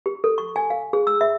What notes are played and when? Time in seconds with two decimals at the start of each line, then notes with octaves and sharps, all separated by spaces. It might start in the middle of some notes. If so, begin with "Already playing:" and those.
0.06 G4
0.24 A4
0.38 C#6
0.56 G#5
0.70 F5
0.93 G#4
1.07 E6
1.21 E5